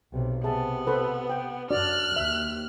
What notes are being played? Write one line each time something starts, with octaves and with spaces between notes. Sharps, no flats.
B1 C3
C3 B3 G#4 E5 A5
A4 B4 C5
G5
F#2 D4 F#4 D5 F6 F#6
D#2 E5